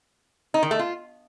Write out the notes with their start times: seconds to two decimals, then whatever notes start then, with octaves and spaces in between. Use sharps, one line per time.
0.54 D#4
0.63 D#3
0.71 A3
0.79 F4